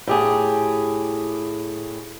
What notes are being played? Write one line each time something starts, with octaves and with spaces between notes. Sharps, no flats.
A2 G4 G#4